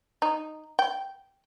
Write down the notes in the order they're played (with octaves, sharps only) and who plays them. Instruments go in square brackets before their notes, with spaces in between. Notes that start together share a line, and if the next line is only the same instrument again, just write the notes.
[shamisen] D#4
G5